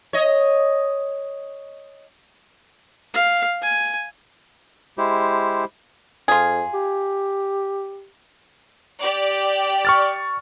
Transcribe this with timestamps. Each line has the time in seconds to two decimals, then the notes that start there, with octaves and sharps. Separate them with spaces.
0.13 C#5 D#5
3.14 F5
3.62 G#5
4.98 G#3 E4 G4 C5
6.28 F2 F4 G#4
6.74 G4
9.01 G4 D5
9.85 C#6 F6 A6